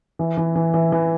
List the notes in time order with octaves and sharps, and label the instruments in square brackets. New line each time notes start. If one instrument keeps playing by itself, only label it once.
[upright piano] E3
E3
E3
E3
E3